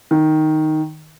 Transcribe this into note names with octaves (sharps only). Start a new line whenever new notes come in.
D#3